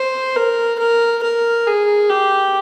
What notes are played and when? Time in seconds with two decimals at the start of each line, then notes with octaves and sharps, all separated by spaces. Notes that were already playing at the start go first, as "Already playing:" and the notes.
Already playing: C5
0.35 A#4
0.79 A#4
1.23 A#4
1.67 G#4
2.10 G4